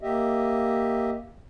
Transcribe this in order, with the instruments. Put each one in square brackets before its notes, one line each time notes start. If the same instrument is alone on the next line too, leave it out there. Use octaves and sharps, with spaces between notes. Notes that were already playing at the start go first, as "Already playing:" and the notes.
[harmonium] A#3 G4 D#5 E5